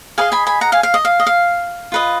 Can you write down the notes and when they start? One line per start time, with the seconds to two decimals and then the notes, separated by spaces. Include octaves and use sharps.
0.18 G#4 B4 D#5 F5 G#5
0.32 G#5 B5
0.47 G#5 B5
0.61 F#5 A#5
0.72 F5 G#5
0.83 F5
0.94 D#5
1.05 F5
1.20 D#5
1.27 F5
1.92 F4 B4 D#5